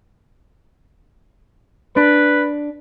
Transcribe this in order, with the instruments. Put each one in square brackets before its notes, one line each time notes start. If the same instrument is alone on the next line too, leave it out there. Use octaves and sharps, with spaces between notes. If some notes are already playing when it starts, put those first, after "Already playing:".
[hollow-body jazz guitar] D4 [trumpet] B4